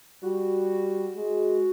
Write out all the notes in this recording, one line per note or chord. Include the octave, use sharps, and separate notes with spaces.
G3 F#4
G#3